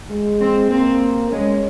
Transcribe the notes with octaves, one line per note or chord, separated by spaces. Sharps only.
G#3
C4
A#3 C4
G#3 C#4